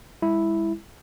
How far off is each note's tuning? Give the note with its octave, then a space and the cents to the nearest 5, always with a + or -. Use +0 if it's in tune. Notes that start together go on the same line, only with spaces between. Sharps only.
G#3 -40 E4 -5